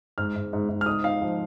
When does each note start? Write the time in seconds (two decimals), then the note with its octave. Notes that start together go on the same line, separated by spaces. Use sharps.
0.18 G#2 F6
0.36 G#2
0.53 G#2
0.69 G#2
0.81 F6
0.86 D#4 D#6
1.04 D#4 F5
1.22 F3